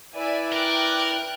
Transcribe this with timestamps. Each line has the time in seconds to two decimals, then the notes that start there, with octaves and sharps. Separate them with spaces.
0.15 E4 B4 D5 E5 G#5
0.52 A#4 D5 G5 F#6